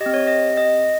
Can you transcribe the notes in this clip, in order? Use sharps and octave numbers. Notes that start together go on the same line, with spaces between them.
G4 D#5
C4
C#5
D#5
D#5